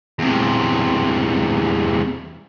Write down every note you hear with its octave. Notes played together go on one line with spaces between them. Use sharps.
E2 C3